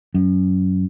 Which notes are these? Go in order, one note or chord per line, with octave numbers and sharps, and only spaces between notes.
F#2